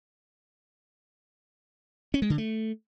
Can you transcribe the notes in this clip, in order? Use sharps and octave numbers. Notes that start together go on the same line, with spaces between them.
C#4
G#3
D3
A3